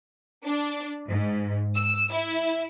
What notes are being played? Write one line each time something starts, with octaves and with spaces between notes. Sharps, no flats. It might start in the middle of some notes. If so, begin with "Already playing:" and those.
D4
G#2
E6
E4